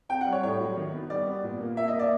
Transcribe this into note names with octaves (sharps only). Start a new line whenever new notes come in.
C4 G5
F#5
G3
C#5
A2 C#5
F#3
D#3
B3
G3 D5
B3
A#2
A#3
A#3 E5
D#5
A#3
D5